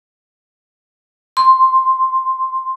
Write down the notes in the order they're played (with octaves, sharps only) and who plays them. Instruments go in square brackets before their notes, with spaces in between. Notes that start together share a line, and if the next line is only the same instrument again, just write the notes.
[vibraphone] C6